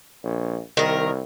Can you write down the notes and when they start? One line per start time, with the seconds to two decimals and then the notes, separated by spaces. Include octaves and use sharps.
0.24 A#1
0.77 C2 D#3 A#4